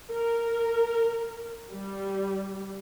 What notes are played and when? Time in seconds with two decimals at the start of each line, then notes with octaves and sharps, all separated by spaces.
0.10 A#4
1.71 G3